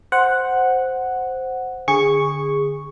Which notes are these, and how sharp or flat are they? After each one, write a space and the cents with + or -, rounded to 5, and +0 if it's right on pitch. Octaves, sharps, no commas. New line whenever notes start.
C5 +0 F#5 +0
D3 +0 G#4 -20 C#6 +0